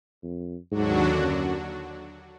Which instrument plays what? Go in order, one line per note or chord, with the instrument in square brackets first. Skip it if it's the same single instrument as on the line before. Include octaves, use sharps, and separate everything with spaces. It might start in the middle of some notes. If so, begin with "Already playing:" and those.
[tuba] F2
[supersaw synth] D#2 D3 F#3 D4 F#4 [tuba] G#2
[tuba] F#2